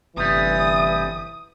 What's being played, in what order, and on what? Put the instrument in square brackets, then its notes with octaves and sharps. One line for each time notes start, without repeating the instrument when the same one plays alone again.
[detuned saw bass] G1 [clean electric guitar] A2 C3 G3 [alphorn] E3 [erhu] D#6